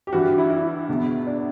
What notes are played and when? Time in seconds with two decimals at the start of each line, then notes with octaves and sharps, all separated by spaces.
0.07 G4
0.12 G2 E3 F#4
0.25 F#4
0.38 E4
0.50 E4
0.89 E2 B2
1.27 D4